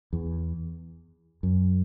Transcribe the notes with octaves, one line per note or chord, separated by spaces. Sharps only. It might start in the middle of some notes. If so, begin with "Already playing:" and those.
E2
F#2